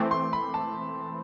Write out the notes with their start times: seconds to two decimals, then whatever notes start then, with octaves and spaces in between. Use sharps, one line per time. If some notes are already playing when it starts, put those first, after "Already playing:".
Already playing: E3 A3 C4 D6
0.11 C6
0.33 B5
0.54 A5